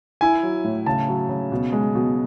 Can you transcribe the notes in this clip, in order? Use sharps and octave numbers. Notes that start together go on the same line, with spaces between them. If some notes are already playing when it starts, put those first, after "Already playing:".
E4 G#5
F#3
A2
C#3 A5
F#3
C#3
B2
G#3
B2